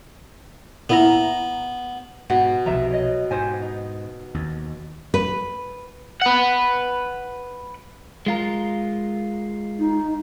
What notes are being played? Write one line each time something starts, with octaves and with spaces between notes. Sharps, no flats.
A#2 B3 E4 A#5
G#2 B2 F#5
B1 C3 F3 E5 A#5
C#5 D#5
G#2 G4 C5 G#5
D#4
D#2
B4
B4 F#5
G#3 F4 A#4
D#4